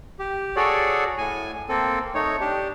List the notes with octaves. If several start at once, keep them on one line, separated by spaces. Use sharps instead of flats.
G4
F#4 G#4 A4 C#5 D5
A2 G#5
A#3 C4 A4
A3 D#4 C#5
D4 G4